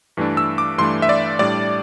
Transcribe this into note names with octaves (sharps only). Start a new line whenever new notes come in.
G2 E3 A3 D4
E6
D6
G2 E3 A3 D4 C6
E5
D5
A2 G3 D4 D5